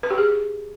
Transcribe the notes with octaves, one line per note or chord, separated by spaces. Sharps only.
B4
G4
G#4